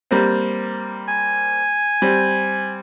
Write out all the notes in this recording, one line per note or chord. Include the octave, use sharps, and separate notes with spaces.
G3 A#3 C4
G#5
G3 C4